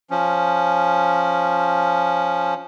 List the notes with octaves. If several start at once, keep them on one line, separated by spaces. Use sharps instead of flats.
F3 C#4